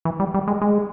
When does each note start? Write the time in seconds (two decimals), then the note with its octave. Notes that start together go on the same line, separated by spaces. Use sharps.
0.05 E3
0.20 G3
0.34 G3
0.48 G#3
0.62 G#3